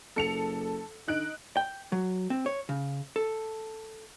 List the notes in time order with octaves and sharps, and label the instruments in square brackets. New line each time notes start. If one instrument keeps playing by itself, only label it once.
[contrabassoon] F#1 [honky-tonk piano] A4 C#7 F7
[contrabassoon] D3 [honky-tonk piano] D#4 F#6 D7
[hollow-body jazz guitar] G5
F#3
C4
C#5
C#3
A4